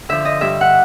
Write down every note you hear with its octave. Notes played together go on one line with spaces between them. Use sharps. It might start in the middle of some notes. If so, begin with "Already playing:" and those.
D3 F3 E5
D#5
G2 E5
F#5